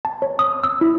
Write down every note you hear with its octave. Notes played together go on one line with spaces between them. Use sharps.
A5
C#5
D#6
E6
E4